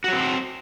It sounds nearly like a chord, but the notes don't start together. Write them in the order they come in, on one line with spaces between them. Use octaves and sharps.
F#4 F#3 C4 C5